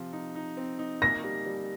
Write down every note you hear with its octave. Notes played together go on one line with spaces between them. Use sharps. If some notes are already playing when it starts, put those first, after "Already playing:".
Already playing: C3 F3
D#4
D#4
C4
D#4
A#3 A#6
G3
G3